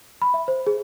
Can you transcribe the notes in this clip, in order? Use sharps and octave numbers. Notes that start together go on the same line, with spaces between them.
B5
E5
C5
G#4